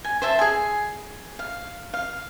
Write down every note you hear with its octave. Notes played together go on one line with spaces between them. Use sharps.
G#5
C5 E5 A5
G#4 G#5
F5
F5